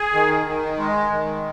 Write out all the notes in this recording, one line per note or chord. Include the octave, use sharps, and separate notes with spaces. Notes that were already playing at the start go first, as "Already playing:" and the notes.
Already playing: G#4
D#3
D#3
G#3
D#3